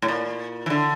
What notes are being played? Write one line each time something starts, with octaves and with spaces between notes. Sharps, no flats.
A2
A#2
E3
D3